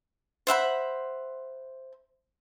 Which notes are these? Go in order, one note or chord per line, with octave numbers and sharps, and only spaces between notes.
C5 E5 F#5 B5